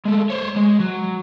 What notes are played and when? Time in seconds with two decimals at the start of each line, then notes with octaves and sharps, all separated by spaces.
0.06 G#3 A3
0.30 C5 C#5
0.56 G#3
0.80 F#3